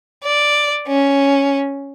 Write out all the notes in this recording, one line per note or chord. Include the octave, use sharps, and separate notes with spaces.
D5
C#4